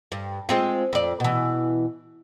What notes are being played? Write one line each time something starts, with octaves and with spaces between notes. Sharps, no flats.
G2
G#3 C4 F4
F2 D5
B2 E3